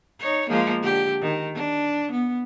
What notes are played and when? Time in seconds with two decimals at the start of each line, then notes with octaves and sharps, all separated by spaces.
0.20 D#4 C#5
0.49 F3 G#3 A#3
0.81 D3 G4
1.21 D#3
1.54 D4
2.11 B3